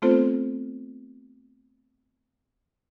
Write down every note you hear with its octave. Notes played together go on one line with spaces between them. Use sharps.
A3 B3 C4 F4 A4 C5